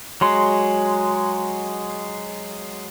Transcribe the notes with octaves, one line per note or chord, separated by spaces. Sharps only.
F#3 G#3 C6